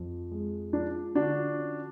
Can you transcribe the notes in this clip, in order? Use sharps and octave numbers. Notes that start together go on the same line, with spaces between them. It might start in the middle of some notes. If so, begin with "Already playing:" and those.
Already playing: F2
G#3
F3 D4
D3 D4 F#4
C#4